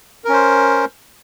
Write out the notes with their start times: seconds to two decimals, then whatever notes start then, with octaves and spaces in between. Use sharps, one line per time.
0.25 A#4
0.29 C#4
0.33 C5